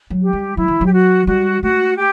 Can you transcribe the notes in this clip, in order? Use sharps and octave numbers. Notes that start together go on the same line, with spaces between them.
F#3
G4
G3
F#3 E4
E3
F#3
G4
F#4
G3 F#4
A3 F#4
G4